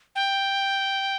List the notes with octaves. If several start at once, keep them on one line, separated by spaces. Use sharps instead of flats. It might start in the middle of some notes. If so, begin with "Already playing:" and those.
G5